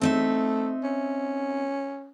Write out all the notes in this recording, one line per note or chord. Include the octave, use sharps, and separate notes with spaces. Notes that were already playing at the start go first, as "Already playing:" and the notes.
A3 C4 D#4 E5
C#4